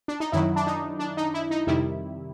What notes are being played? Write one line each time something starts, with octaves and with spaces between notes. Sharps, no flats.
D4
D#4
F#2 D#3 F#3 E4
D4
D#4
D4
D#4
E4
D#4
F2 C3 D#3 G3 E4